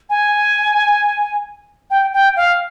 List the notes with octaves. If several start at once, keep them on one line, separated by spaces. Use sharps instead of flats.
G#5
G5
G5
F5